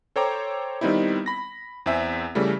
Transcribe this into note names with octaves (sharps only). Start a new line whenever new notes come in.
A4 C5 C#5 G5 A#5 D6
D#3 G3 B3 C4 D#4 E4
B5 A#6
E2 C4 E5 G#5
C#3 E3 G3 A3